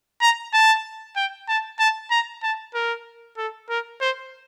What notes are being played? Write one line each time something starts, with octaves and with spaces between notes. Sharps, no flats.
A#5
A5
G5
A5
A5
A#5
A5
A#4
A4
A#4
C5